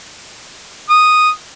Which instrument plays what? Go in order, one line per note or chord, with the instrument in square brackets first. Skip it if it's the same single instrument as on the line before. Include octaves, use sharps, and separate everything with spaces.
[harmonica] D#6